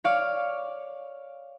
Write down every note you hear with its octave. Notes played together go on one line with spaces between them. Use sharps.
C#5 D5 F5